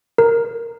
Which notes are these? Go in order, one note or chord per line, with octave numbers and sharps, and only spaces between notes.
A#4